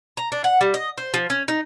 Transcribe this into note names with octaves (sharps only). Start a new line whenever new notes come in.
A#5
D4
F#5
G3
D#5
C5
F3
C#4
D#4